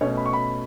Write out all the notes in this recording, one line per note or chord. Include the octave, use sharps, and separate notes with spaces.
B2 A3 C#4 C#5
B5
C#6
B5